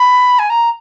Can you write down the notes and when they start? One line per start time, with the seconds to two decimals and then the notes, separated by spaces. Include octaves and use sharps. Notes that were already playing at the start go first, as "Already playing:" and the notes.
Already playing: B5
0.39 G#5
0.50 A#5